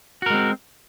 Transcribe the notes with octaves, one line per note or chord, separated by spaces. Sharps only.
G#3 C4 F#4 A#4